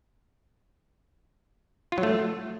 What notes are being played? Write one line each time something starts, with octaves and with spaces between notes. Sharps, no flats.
F4
F#3
A3